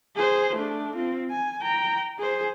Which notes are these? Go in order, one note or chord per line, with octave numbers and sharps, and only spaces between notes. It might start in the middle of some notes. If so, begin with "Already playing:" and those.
G#4 C5
A3 D4
C4 F4
G#5
G5 A#5
G#4 C5